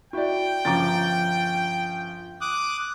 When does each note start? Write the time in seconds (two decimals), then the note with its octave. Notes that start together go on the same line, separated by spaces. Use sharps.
0.13 E4 F#4 D5 G5
0.65 G1 F3 C#4 A#5 D6 A6
2.41 D6 D#6 F#6